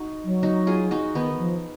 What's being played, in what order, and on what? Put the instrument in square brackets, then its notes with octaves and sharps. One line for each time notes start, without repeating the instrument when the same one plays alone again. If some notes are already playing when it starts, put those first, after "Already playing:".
Already playing: [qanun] D#4 F#4
[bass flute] F#3
[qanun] D#4 F#4
F4 G#4
D#4 F#4
[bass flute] D#3 [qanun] B3 D#4
[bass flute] F3